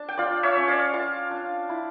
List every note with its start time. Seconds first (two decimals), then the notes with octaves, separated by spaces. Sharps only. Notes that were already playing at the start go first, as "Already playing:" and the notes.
Already playing: D4 A5
0.09 G5
0.17 F4 D5 F5
0.43 C#5 E5
0.56 C#4
0.68 D5 F5
0.94 F4 F5 A5
1.31 D4
1.69 E4